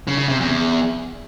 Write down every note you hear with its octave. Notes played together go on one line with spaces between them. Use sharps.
C#3
C#3
C3
E2